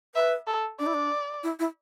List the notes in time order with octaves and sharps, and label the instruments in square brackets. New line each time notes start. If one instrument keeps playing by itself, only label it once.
[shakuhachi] B4 [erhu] E5
[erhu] A4
[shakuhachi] D4 [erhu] D5
[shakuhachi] E4
D4
E4
E4